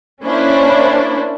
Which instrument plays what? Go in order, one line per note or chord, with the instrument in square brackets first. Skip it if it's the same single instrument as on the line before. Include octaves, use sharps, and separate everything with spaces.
[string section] A#3 C#4 D4 E4 C5